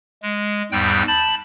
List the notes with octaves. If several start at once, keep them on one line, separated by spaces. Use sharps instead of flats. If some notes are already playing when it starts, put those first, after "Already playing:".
G#3
E2 G#2 G3 G5 F#6 G6
A5 B5 G6 A6